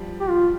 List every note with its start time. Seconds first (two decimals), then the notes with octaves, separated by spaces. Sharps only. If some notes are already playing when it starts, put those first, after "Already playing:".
Already playing: F3 G3
0.20 G4
0.29 F4